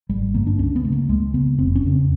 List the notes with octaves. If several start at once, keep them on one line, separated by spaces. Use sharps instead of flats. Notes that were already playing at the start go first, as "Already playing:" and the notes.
G#1 G3
G2 D3 A#3
D4
C#2 C#4
B3
C#3 A3
A#3
C#2 G#3
C#3 B3
F1 C4
C#4
E2 C#3
C4